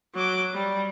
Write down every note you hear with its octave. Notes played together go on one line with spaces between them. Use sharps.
F#3 D6
G3